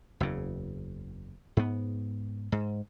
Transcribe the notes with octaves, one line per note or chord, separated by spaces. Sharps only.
F#1 E2 C#3
G#2 B3
G#2